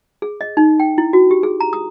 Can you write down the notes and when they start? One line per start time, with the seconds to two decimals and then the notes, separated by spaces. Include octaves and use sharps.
0.22 G#4
0.41 D#5
0.57 D#4
0.80 G5
0.98 E4
1.13 F#4
1.31 G4
1.43 G#4
1.60 A#5
1.73 D#6